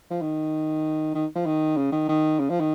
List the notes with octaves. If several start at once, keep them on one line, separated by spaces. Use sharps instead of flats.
F3
D#3
D#3
F3
D#3
C#3
D#3
D#3
C#3
F3
D#3